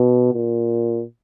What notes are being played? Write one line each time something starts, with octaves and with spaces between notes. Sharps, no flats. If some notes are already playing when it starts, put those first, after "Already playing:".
Already playing: B2
A#2